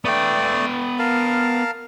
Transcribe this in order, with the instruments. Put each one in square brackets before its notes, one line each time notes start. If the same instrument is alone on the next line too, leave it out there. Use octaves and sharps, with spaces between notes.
[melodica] A3 D5 [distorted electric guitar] B3 G5
[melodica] A#4 F5 A5